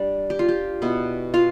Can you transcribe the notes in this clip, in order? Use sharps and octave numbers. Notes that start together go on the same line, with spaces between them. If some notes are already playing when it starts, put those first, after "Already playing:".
Already playing: G3 D4
G4
F4
G4
B2 B3 E4
F4 F5